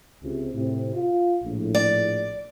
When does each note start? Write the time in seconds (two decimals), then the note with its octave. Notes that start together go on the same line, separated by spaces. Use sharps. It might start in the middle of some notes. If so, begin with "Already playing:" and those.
0.22 C#2 C3
0.55 A2 C3
0.95 F4
1.44 A#1 A2
1.75 D5